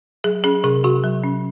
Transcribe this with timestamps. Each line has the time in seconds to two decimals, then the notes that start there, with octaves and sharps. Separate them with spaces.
0.24 F#3 G#4
0.44 C#4 G#4
0.64 C3 G#4
0.84 C3 F#4
1.04 F#3
1.24 C#4